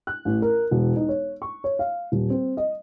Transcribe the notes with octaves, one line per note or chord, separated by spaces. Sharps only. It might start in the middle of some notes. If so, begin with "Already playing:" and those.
F#6
A1
A#4
E1
D#4
C#5
C#6
C#5
F5
D#1
C4
D#5